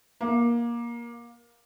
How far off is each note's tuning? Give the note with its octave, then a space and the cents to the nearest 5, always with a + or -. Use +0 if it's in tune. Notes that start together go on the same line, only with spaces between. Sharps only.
A#3 +20